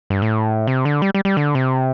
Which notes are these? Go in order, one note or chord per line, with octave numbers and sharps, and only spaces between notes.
G2
A2
C3
D3
G3
G3
G3
D3
C3